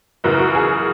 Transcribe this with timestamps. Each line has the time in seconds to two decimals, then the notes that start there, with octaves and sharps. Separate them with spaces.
0.24 F#2 C#3 E3 F#4 A#4
0.39 F#4
0.55 G#4